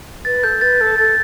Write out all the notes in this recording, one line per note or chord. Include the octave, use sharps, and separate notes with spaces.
B4 A6
A4 G6
B4 A6
A4
A4 A6